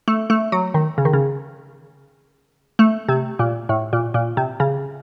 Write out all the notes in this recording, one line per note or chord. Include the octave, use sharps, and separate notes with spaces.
A3
A3
F#3
D#3
C#3
D#3
C#3
A3
C3
A#2
A2
A#2
A#2
C3
C#3